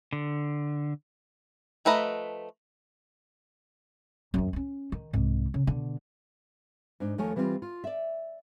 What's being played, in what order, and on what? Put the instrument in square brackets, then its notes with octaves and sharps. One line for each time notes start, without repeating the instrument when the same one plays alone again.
[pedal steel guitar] D3
[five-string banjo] F3 A3 B4 D#5 A#5
[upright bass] F#2 D#3
B3 C#4
D#3
C2 G#2
C#3
B2 D3
[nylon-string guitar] G#2 D4 D#4
D#2 F3 A3 A#4 C#5 G#5
E3 G3 C4 D#4 F4
F4
D5 E5